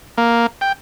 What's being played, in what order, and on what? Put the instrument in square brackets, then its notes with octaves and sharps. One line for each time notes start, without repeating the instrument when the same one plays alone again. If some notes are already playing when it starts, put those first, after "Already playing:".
[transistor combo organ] A#3
G5